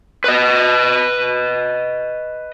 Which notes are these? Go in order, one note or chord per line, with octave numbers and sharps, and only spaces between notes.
B4 D#5